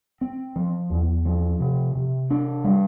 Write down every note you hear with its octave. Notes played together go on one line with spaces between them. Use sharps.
C4
F3
E2
F3
C3
C3
D4
G3